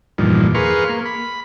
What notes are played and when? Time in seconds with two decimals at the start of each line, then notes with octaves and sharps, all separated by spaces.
0.18 E2 G2 A#2 D#3 F3
0.55 G#4 A#4 B4 F5 C6 C#6
0.89 A#3
1.06 B5